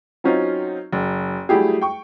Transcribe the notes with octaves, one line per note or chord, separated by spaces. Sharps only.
F#3 C4 C#4 D#4 F4
F#1
F#3 G3 A3 E4 G4 G#4
G5 C#6